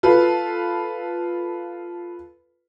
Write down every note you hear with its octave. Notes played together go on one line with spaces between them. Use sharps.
F4 A4 B4